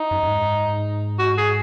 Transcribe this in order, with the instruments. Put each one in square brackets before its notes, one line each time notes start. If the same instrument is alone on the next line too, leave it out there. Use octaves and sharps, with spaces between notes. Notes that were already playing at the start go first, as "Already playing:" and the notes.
Already playing: [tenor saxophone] D#4
[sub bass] F#2
F#2
G#2
[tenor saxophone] F#4
G#4